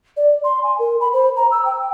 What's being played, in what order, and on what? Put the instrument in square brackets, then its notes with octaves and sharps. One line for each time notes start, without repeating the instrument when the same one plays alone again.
[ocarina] D5
C6
G#5
A#4
B5
C5
A#5
E6
G5